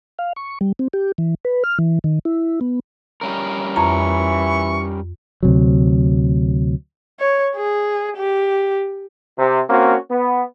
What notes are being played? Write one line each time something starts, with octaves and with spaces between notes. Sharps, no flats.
F5
C#6
G3
C4
G4
E3
B4
F6
E3
D#3
E4
B3
G3 C#4 A#4
F2 E3 A#5 C#6
D2 C3 F#3
C#5
G#4
G4
C3
A#3 C4 C#4 F#4
B3